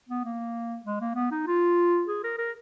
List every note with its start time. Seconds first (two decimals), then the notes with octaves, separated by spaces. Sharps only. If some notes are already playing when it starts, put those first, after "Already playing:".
0.09 B3
0.25 A#3
0.85 G#3
1.01 A#3
1.16 B3
1.31 D#4
1.47 F4
2.08 G#4
2.24 A#4
2.38 A#4